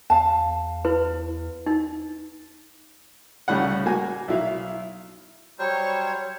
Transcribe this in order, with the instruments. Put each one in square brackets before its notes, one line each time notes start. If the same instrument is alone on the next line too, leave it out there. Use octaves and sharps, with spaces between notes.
[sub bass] E2 [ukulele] F5 A5
[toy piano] E4 B4
D#4
[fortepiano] C2 A2 C#3 G3 F#5
A#3 F#4 G#5
B1 E4 F5
[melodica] F#3 G3 C5 [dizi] C#5